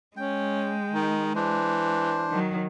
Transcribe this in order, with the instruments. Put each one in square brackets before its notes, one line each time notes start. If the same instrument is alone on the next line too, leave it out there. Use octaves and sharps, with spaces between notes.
[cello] G#3 [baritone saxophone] C#4 [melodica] G5
[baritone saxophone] D#3
[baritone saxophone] E3 [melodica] D4 C5
[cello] D#3 F#3